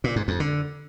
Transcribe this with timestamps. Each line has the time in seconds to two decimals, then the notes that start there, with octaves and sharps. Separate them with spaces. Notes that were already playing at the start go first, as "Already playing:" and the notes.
0.04 A#2
0.16 G#2
0.28 F2
0.40 D3